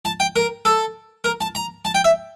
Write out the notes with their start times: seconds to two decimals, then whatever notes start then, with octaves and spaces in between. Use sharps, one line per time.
0.05 A5
0.20 G5
0.36 A#4
0.65 A4
1.24 A#4
1.41 A5
1.55 A#5
1.85 A5
1.95 G5
2.04 E5